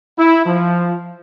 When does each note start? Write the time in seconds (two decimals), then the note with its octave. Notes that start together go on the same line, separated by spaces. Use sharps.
0.17 E4
0.45 F3